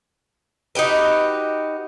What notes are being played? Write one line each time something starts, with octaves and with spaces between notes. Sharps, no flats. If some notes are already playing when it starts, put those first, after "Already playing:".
D#4 F#4 G4 B4